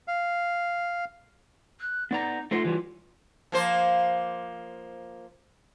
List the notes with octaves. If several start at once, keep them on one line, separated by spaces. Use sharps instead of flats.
F5
F#6
B3 D#4 D5 A#5
A3 D#4 F4 C5
E3 F#3 G3
F3 A#3 C5